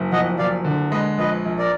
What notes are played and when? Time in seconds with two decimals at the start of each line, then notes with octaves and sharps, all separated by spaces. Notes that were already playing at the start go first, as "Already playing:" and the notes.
Already playing: F#1
0.12 F2 D#5 F#5
0.38 F#1 D5 F5
0.65 D3
0.91 G#3 B4 D#5
1.18 A#1 B4 D#5
1.46 A#1
1.59 A#4 D5